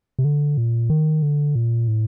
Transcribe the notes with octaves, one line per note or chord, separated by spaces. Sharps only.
C3
D3
A#2
D#3
D3
A#2
A2